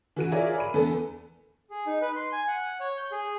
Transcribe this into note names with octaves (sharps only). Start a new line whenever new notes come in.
E3 F#4 D#7
F4 G#4 A#4 C#5 D5 E5
B5 D#7
E2 B3 A4
G#4
D#4
B4
C6
G#5
F#5
C#5
G6
G#4